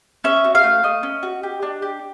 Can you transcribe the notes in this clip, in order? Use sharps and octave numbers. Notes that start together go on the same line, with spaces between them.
C#4 E5
F#4
F5
A3
A3 D#5
C#4
F#4
G4
D4
G4